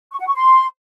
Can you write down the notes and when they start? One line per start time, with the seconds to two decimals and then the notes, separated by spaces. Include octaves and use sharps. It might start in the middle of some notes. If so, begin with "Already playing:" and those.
0.12 C#6
0.19 F#5
0.27 C#6
0.34 C6